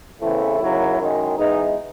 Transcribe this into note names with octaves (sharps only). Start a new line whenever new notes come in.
E2 C#3 E3 A3 C4 E4
D#2 C#3 F#3 A#3
F#2 D#3 G#3
G#2 E3 G#3 B3 D#4